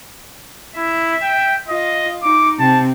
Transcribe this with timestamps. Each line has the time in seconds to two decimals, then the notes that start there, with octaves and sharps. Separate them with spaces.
0.77 E4 E5
1.23 G5
1.68 F4 D#5
2.23 D#4 D6
2.59 C3 C4 A5